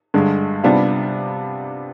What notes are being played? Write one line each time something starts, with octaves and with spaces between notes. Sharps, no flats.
G2 D3 G#3
C3 G3 B3 D4 F4